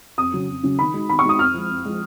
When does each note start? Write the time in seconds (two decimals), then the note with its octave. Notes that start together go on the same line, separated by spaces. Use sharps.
0.18 F2 D#6
0.33 C#3 F#3 C#4
0.48 F2
0.63 C#3 F#3 C#4
0.79 D#3 B5
0.94 G#3 D#4 F#4
1.09 D#3 B5
1.19 C#6
1.24 G#3 D#4 F#4 D#6
1.39 F2 F6
1.54 F3 G#3
1.69 F2
1.85 F3 G#3